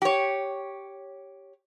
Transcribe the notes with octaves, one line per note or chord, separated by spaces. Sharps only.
G4 C#5